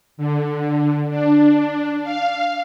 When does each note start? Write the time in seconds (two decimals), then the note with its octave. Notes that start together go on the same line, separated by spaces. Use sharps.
0.17 D3
1.10 D4
2.03 F5